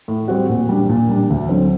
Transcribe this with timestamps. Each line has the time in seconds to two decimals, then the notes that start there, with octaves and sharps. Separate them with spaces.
0.08 A2
0.28 G3 C4 F#4
0.49 A#2
0.69 G3 D4
0.89 A#2
1.09 G3 D4
1.30 D2
1.49 D3 F#3 C4